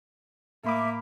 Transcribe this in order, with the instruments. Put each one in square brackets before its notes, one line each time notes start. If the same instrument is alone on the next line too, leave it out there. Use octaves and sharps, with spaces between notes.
[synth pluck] A2 B5 D6 [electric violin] A#3 [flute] E5